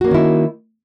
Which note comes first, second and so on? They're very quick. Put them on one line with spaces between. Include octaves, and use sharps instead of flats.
F#4 A#3 C#4 D#3 E4